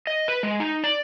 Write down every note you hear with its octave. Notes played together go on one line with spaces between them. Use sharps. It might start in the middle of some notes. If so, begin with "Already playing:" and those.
D#5
B4
G#3
D#4
D5